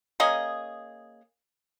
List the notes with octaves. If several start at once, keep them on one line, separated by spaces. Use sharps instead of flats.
A#3 C#4 G#4 D#5